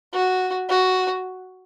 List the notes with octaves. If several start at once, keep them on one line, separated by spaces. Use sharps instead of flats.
F#4
F#4